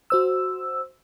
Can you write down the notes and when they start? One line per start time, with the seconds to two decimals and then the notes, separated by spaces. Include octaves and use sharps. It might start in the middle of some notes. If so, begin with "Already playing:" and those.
0.10 F#4 C5 E6